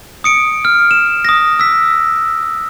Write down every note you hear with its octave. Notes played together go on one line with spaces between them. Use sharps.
D#6 C#7 D7
F6
E7
D#6 A#6
E6 B6